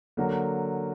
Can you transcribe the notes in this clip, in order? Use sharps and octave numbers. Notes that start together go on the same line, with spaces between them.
D3 F#3 A#3